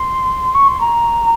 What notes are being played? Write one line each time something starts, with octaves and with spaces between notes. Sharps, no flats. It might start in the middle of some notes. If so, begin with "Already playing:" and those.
Already playing: C6
C#6
C6
A#5